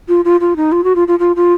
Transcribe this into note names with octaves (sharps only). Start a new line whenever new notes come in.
F4
F4
F4
D#4
F4
F#4
F4
F4
F4
F4